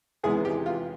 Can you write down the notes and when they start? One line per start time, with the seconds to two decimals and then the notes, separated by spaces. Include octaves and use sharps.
0.24 E2 C3 E3 G#3 B3 G#4
0.45 G4
0.66 F4